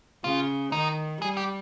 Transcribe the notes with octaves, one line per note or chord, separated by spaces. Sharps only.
C#3 F4
D#3 D#4
G3 G#4
G4